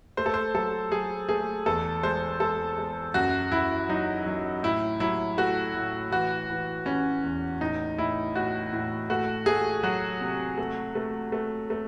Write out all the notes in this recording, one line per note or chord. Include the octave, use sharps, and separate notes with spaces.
A3 C5
A4
C5
F#3 A4
F#3 G#4
A3 G#4
E2 A4
G#3 C5
G#3 A4
G#3
F#2 F#4
F#2 E4
F#3 D#4
F#3
A2 E4
F#3 E4
A3 F#4
A2
E3 F#4
E3
E3 C#4
E2
A2 D#4
A2 E4
A2 F#4
A2
A3 F#4
A3 G#4
F#3 F#4
C3
A3
A3
A3
A3